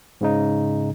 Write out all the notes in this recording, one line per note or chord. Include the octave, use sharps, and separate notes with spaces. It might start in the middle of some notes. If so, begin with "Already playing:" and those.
G#2 C#3 D#4